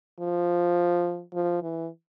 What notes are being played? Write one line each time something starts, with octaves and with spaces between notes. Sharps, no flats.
F3
F3
E3